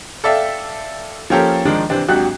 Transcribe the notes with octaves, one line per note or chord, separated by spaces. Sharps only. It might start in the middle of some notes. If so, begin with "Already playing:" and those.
A4 D5 E5 F5 G5
F3 A#3 C#4 G4 A4 A#4
D#3 F3 G#3 D4 D#4 A#4
C3 E3 C4 D4
G#1 F#3 D4 F#4 G4 F#6